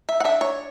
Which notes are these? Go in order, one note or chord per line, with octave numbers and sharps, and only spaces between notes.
E5
F#5
D4 E5
C#5